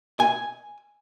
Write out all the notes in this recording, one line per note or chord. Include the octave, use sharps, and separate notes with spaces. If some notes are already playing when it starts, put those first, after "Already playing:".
G#5